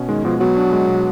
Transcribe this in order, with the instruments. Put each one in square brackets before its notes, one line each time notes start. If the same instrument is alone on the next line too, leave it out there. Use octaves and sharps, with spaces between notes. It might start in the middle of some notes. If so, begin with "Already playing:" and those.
Already playing: [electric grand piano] B2 C#4
[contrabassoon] D#3 [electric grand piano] G#3
[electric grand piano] B2 [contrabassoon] F3
[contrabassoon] F#3 [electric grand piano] B3
[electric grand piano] D4
G#3
B2